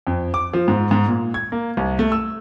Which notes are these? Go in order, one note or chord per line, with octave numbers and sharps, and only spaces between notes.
F2
D6
F3
G#2
G#2
A#2
G#6
A#3
C2
A3
E6